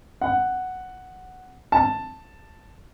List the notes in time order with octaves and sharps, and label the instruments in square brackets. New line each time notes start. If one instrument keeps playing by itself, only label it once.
[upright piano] F#5
A5